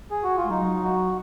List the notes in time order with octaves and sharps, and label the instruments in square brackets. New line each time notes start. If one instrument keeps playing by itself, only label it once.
[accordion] G#4
F#4
F4
[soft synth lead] G#3
[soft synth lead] F#3 [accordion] D#4
[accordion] F#4